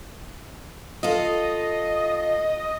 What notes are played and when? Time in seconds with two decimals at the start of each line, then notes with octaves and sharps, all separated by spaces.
1.03 F4 A4 D#5